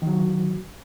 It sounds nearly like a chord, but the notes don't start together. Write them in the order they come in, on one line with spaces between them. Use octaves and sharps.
D#3 F#3 F#4 D3